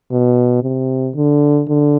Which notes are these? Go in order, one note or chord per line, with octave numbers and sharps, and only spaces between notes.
B2
C3
D3
D3